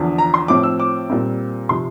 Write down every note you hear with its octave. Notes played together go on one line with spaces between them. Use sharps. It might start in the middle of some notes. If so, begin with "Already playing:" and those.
Already playing: E2 D3 F3
A#5
C6
A2 F3 C4 D6
E6
D6
A#2 G3 C4
C3 F3 C6